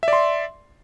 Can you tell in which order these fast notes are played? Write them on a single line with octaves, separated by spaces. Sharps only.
E5 D5 C6